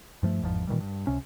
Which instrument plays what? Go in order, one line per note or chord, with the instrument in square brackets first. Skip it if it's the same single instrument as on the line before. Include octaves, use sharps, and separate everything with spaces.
[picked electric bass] G2 F3 A3
G1 E2 G#2 F3
A#2 D#3 E3 G3
G2
C#2 C3 C#4